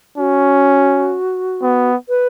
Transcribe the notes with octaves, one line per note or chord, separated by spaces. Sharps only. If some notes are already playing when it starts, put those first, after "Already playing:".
C#4 F#4
B3
B4